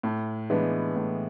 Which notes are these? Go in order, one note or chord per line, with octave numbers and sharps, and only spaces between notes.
A2
E3 G#3 B3 D4
A2